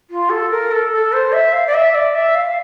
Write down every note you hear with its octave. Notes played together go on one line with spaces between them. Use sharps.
F4
A4
A#4
A4
A4
C5
E5
F5
D5
E5
D5
E5
F5